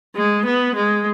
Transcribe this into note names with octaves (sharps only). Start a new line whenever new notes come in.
G#3
B3
G#3